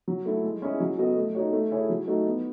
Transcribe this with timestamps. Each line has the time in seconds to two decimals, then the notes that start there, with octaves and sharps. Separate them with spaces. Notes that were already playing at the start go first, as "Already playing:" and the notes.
0.08 F#3
0.26 A3 E4 A4
0.44 G#3
0.62 C#4 E4 G#4 D#5
0.80 F#3
0.98 B3 F#4 A4 D#5
1.17 A3
1.35 D#4 F#4 C#5
1.53 A3
1.71 E4 G#4 C#5
1.90 F#3
2.08 A3 D#4 F#4 A4
2.26 B3